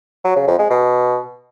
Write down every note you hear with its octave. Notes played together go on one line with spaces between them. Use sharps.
F#3
C#3
F2
G#3
B2